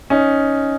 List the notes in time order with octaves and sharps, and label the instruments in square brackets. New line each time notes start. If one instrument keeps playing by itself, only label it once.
[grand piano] C#4 D#4